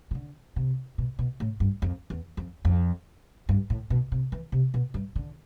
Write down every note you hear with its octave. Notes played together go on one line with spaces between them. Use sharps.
C3
D3
C3
B2
B2
A2
G2
F2
E2
F2
F2
G2
A2
B2
C3
E3
C3
B2
G2
D3